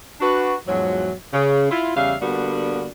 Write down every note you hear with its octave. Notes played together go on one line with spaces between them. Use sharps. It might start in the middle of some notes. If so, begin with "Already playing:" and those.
D4 F#4 B4
E2 G#2 F3 F#3
C#3
E4 F4
E2 C#3 G3 E5 F5
D3 G3 A#3 B3 D4 F#4